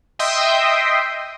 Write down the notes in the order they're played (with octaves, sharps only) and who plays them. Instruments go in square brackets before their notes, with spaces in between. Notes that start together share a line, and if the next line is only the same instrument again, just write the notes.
[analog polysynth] D#5 E5 G5 C6 D#6